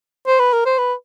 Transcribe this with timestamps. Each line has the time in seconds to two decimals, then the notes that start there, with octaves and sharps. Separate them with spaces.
0.27 C5
0.39 B4
0.53 A#4
0.65 C5
0.78 B4